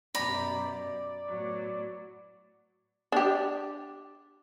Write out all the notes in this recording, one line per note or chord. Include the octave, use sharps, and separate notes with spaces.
F#2 B2 G3 D5 A#5 B5
A2 F#3 B3
D4 G4